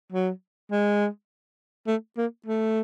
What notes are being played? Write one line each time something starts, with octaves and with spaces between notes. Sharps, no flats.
F#3
G#3
A3
A#3
A3